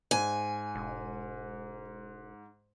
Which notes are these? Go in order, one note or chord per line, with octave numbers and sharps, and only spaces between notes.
G#2 G#5
E1